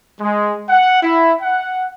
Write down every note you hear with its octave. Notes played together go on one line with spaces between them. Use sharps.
G#3
F#5
E4
F#5